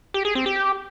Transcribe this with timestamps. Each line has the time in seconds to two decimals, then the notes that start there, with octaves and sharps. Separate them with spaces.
0.14 G4
0.25 G#4
0.35 C4
0.46 G4